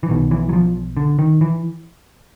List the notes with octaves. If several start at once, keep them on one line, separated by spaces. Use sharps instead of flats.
E3
B1 B2 D#3
E3
F#3
F3
D3
D#3
E3